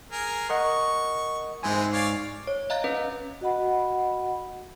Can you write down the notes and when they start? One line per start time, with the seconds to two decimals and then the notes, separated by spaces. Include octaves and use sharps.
0.12 G#4 A#4
0.49 A#4 D#5 F#5 C#6
1.63 G#2 E3 G#3 C4 G#5
1.93 C#5 D5 F5
2.47 C#5
2.70 D#5 F5 A#5 F#6 A6
2.84 C#4 B4
3.41 F#4 D#5 F#5 B5